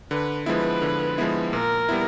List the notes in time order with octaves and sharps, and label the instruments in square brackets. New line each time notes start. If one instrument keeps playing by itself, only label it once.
[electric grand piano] D3 [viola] B4
[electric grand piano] F3 G#3 B3 E4 [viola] B4
[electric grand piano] D3
F3 G#3 B3 E4
[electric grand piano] A#2 [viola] A#4
[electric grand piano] G3 B3 E4